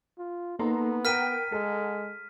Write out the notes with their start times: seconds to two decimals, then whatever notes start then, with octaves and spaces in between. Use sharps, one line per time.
0.18 F4
0.59 A#3 B3 D#4 A4 A#5 C6
1.05 A#4 F#5 G5 A#5 F6 A#6 B6 D#7
1.52 G#3 A4